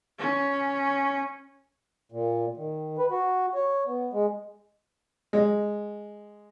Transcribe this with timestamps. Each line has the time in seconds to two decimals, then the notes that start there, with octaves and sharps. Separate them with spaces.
0.19 C#4
2.12 A#2
2.57 D#3
2.98 B4
3.11 F#4
3.55 C#5
3.86 B3
4.13 G#3
5.33 G#3